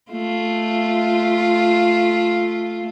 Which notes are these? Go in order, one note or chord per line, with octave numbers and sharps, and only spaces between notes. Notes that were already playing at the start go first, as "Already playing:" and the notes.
A3 F4